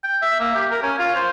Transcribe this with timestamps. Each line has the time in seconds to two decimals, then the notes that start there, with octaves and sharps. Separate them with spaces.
0.04 G5
0.22 E5
0.40 A#3
0.55 G4
0.71 A#4
0.83 C#4
0.99 F4
1.15 C5